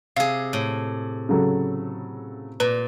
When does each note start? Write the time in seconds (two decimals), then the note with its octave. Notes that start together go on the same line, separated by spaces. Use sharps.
0.16 C3 G#4 F5
0.53 A2
1.29 C#3 F#3 A4
2.60 A#2 B4